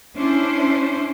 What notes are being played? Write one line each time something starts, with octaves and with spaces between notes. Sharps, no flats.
C#4 D4 E4 C5